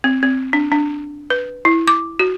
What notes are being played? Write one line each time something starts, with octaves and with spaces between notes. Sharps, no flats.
C4
C4
D4
D4
B4
E4
D6
F#4